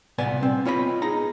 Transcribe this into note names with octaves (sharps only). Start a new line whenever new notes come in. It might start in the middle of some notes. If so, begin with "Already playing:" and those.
C2 A#2 B3 D5 G#5
C4
B3 F4 C#5 D#5 G#5 B5
D#4 G#4 A#5